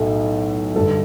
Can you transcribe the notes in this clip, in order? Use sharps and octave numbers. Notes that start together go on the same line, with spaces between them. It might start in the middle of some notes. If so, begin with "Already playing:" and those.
Already playing: B1 A2 A4
G2 D3 G3 A4